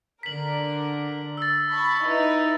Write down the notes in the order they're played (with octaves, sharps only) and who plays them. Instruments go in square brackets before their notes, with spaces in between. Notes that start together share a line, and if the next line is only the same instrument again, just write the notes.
[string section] D3 A#4 [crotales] B6 F#7
[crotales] E6 A6
[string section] A5 B5 C#6
D#4 E4 B4